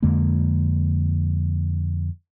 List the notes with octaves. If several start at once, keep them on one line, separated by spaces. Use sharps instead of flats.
F2 D3 G#3 A#3